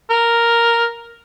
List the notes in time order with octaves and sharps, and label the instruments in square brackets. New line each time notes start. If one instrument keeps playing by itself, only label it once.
[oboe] A#4